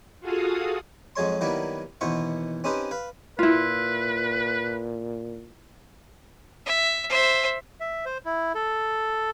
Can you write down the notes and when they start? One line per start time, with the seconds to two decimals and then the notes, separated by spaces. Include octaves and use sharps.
0.20 F4 F#4 G#4 A4 F5 D#6
1.16 F2 F#3 G#3 C#5 C6
1.41 D#3 F#3 G3 A#3 B3 E4
2.01 D#2 B2 E3 B3 C5 C#6
2.64 C4 C#4 D#4 G4 B4 C5
2.91 B4 F5
3.39 A#2 E4 F4 B4
6.65 E5
7.09 C5 E5
7.80 E5
8.06 C5
8.26 E4
8.55 A4